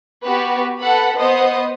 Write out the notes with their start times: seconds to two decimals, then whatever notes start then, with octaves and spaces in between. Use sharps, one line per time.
0.23 B3 F#4 G4 B4
0.80 A4 B4 F#5 B5
1.16 B3 C5 D#5 D#6